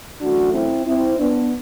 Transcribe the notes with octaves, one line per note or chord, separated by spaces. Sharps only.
F#2 E3 A3 D4 F#4
C4 E4
C4 E4
B3 D4